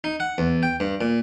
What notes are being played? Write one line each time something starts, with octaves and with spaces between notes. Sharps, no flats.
D#4
F#5
E2
G5
G2
A#2